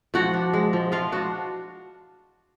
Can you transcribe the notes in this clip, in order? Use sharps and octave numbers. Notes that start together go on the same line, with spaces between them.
F3 F#4 F#5
D4
G#3
F3
F3 F4 F5
D4 F#4